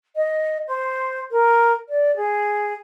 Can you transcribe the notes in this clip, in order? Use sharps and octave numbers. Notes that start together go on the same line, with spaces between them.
D#5
C5
A#4
D5
G#4